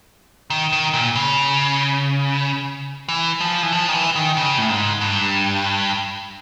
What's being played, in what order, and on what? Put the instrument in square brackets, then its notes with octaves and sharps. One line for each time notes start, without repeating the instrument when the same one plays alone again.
[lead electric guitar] D#3
D#3
A#2
C#3
E3
F3
E3
F3
D#3
E3
D#3
C#3
A2
G#2
G2